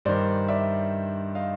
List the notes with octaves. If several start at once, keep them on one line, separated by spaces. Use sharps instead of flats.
G2 D#3 C5 D5
D5 E5
D#5 F5